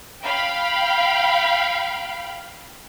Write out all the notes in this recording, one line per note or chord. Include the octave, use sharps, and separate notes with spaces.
F5 G5 B5